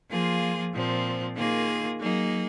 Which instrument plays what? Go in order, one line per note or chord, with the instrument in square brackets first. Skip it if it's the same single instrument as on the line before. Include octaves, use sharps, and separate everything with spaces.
[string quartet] F3 A#3 F4 G#4
A#2 F3 C4
D#3 A#3 F4 G#4
F#3 A#3 D#4 G#4